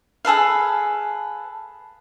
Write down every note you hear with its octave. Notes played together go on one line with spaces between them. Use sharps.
G#4 A4 B4 F5